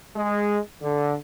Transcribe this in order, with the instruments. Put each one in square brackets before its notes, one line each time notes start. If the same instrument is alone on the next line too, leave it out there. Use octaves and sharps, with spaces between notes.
[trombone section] G#3
D3